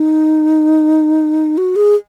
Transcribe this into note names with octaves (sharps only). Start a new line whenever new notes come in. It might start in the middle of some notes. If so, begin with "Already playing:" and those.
Already playing: D#4
F#4
G#4